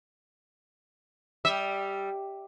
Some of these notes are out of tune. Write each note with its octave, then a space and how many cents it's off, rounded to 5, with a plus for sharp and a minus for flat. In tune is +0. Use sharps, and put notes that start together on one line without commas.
G3 +0 E5 -25